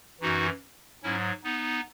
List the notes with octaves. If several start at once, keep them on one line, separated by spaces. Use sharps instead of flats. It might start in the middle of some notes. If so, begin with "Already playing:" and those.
F#2 E3 D#4 F#4
G#2 F#3 C#4 E4
B3 D#4